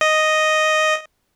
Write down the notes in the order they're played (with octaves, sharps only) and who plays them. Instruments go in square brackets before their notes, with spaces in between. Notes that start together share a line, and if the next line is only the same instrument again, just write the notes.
[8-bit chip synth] D#5